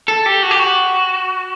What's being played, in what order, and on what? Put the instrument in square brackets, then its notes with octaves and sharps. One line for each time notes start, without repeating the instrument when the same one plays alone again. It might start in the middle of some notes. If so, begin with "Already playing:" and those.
[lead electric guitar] A4
G4
F#4
G4
F#4